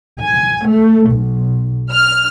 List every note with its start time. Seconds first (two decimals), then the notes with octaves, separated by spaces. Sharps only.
0.19 G#5
0.66 A3
1.09 B1
1.92 F6